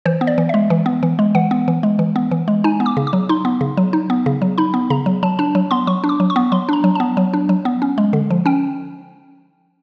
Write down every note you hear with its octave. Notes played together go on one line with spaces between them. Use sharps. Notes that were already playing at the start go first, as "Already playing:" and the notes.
E3 C5
B3
D5
E3
G#3 E5
E3
B3
E3
G#3
E3 F#5
B3
E3
G#3
E3
B3
E3
G#3
D#4 G#5
B3
D6
C#3
D6
F#3
D#4 C6
B3
C#3
F#3
D#4
B3
C#3
F#3
D#4 B5
B3
C#3 A#5
F#3
F#3 A5
D4 A5
F#3
B3 C6
F#3 C#6
D4
D6
F#3
C#6
B3
F#3 C6
D4 A#5
F#3
B3 A5
F#3
D4
F#3
B3
C#4
G#3
D3
F3
C#4 G5